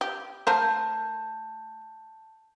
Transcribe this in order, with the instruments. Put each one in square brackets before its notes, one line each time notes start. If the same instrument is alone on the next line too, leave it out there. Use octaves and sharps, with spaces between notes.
[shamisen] G4
[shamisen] A3 A#4 C5 [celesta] A5 G6